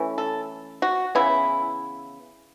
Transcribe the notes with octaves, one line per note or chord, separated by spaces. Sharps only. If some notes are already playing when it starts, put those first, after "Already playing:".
Already playing: E3 A3 C#4
A4
F#4
C#3 E3 B3 E4